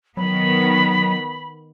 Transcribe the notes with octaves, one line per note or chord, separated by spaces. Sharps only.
D#3 F#3 B3 B5